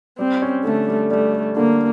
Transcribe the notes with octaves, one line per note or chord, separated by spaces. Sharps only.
G3 C4
C#4
D3 A3
G3
G3 A3
G3
D3 A#3